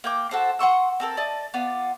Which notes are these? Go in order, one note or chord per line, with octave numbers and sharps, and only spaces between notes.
A#3 G5 D6
F#4 A4 C5
F#5 C6 C#6 E6
C4 A4 A#4
D5 D#5 A5
B3 F4 D5